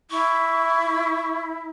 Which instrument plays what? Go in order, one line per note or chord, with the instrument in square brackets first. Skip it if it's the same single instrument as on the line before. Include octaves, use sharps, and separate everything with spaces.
[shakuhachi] E4 [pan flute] C#6